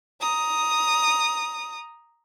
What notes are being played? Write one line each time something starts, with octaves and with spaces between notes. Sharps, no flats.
A#5 D#6